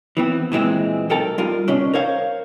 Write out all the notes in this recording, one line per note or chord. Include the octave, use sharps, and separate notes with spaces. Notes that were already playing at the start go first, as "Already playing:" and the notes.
E3 B3 C4
A#2 E3 G#3 C4
B1 A4 A#4 G5 A5
G3 F4 A#4
B2 C#4 D4
A#4 C5 C#5 F5